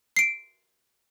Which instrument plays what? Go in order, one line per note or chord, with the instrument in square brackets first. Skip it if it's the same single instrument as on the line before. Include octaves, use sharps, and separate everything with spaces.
[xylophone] C7 D7